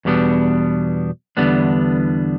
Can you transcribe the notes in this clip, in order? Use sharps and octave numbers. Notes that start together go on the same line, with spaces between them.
E2 B2 G3 B3 D4
E2 D3 G3 B3 D4